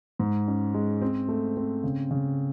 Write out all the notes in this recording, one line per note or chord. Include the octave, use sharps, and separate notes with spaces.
G#2
C#4
G#3
C4
A3
C4
C#3
C#3